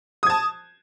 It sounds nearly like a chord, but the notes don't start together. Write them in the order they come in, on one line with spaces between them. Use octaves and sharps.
D#6 G#6 A5